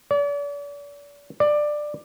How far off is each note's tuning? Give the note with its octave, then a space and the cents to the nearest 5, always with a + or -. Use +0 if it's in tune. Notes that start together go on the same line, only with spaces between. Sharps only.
D5 -40
D5 +15